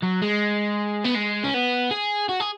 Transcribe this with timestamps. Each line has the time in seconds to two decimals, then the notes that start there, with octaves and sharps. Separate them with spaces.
0.02 F#3
0.22 G#3
1.05 B3
1.15 G#3
1.44 C#4
1.54 B3
1.91 G#4
2.29 F#4
2.40 G#4